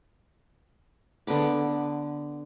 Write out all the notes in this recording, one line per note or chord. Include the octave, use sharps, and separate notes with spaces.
D3 B3 B5 D6